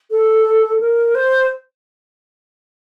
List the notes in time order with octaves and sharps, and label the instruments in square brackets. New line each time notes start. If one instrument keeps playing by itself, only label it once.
[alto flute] A4
A#4
C5